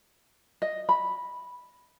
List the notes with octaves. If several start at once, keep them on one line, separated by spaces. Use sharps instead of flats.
D#5
B5